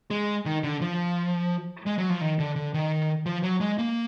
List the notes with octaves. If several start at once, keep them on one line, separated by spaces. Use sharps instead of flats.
G#3
D#3
D3
F3
G#3
F#3
F3
D#3
D3
D3
D#3
F3
F#3
G#3
A#3